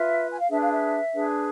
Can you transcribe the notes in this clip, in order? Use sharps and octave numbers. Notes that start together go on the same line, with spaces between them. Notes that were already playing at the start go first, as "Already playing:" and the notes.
Already playing: F4 B4 E5
G#5
F5
D4 G#4 B4 E5
F5
E5
D4 G#4 B4